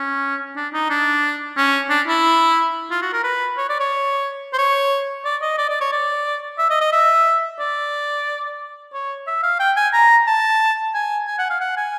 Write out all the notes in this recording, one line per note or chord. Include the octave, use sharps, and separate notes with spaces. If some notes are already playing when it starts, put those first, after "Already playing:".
Already playing: C#4
D4
D#4
D4
C#4
D4
E4
F4
F#4
A#4
B4
C#5
D5
C#5
C5
C#5
D5
D#5
D5
D5
C#5
D5
E5
D#5
D#5
E5
D5
C#5
E5
F5
G5
G#5
A#5
A5
G#5
G#5
F#5
F5
F#5
G#5